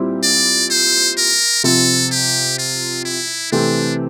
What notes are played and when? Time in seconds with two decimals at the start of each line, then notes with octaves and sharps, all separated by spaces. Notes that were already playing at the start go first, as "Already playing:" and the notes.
Already playing: A#2 G3 C4 E4 G4
0.23 D5
0.70 C5
1.18 A#4
1.64 C3 F3 C4 A4
2.12 G4
2.58 F4
3.05 E4
3.52 C3 E3 A3 C4 D4 G4